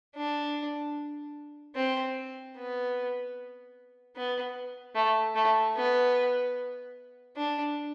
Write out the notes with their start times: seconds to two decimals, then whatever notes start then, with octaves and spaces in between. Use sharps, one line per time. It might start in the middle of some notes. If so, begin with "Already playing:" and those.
0.16 D4
1.76 C4
2.56 B3
4.16 B3
4.95 A3
5.35 A3
5.76 B3
7.36 D4